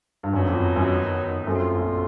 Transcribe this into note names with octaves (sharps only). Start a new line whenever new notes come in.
G2
F#2 D#3 F#3 B3 D#4
F2
F#2
F#2 A3 C4 F4
A#1 A#2